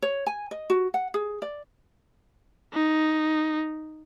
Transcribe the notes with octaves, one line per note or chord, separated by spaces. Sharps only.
C#5
G#5
D#5
F#4
F#5
G#4
D5
D#4